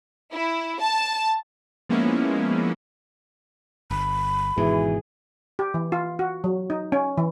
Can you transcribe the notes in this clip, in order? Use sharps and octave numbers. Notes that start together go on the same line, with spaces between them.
E4
A5
F3 G#3 A#3 B3 C#4 E4
G1 B5
G#1 G#2 B2 E3 G#4
G4
E3
F4
F#4
F#3
D#4
C#4
E3